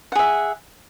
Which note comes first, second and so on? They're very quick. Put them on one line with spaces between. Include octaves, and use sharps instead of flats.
F#5 G#4 E5